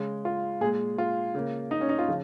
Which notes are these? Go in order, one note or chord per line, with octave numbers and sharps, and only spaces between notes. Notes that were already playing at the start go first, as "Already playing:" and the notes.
Already playing: C#3 G#3
F4
A#2 G#3 G#4
F4
C#3 A#3
D#4
C#4
D#4
F4
C#3 F3